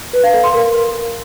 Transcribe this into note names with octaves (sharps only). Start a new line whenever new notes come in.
B4
F5
A4
C6
A#4